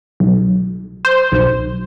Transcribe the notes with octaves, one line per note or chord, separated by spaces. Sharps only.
B1
C5
B1